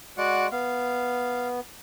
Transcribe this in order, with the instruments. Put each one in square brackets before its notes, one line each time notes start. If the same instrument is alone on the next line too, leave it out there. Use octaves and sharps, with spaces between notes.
[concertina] G#3 [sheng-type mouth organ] F#4 D5 F#5
[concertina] B3 [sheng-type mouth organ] F5